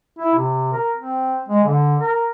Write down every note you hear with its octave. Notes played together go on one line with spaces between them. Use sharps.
E4
C3
A#4
C4
G#3
D3
A#4